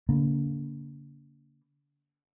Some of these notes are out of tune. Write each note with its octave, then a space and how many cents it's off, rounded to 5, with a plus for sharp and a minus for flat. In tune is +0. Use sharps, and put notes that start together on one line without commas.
D3 -40 A#3 +0